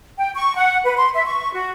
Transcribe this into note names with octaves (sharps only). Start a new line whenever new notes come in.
G5
C#6
F#5
B4
C6
E5
C#6
F#4